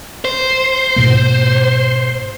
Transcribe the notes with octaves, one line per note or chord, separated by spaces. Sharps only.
C5
G#2 B2 A#3